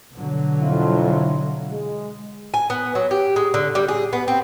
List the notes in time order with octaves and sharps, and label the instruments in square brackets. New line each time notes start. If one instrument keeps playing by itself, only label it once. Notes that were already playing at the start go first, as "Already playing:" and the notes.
[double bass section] B2 D3 F#3
[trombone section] F2 E4 F4
G#3
[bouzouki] G#5
B3
F#3
G4
G#3
D3
G3
G#4
B3
C4